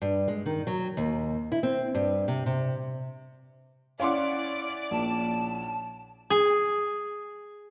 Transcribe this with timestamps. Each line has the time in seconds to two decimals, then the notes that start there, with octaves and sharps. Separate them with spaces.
0.02 G2
0.28 G#3
0.46 D#3
0.67 F#3
0.97 D#2
1.52 E4
1.63 C4
1.95 G2
2.28 C3
2.46 C3
4.00 C#4 E4 D5 F5 F#5 C6 D6
4.91 A#1 A5
6.30 G#4